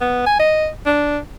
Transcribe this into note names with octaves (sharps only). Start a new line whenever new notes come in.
B3
G#5
D#5
D4